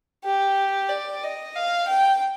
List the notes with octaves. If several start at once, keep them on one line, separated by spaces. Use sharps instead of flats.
G4
D5
D#5
F5
G5